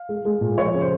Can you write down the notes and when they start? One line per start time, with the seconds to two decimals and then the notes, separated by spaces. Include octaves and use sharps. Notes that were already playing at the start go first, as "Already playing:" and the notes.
Already playing: F5
0.09 G#3
0.25 G#3
0.41 A#2
0.57 F3 C#5
0.74 C#3
0.82 C5